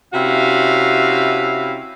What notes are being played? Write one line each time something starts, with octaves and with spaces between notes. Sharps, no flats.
C3 C#4 E4 F#4 F5